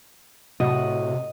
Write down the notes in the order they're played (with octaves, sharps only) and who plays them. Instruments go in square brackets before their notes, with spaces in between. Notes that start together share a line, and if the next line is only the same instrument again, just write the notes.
[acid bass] A2 [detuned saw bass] C3 [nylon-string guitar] F#4 [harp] D#5